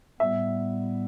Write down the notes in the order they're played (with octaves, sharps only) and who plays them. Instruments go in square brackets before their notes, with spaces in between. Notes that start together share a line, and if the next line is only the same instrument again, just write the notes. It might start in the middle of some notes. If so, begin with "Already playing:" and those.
[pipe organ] A2 G3 B3 [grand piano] E5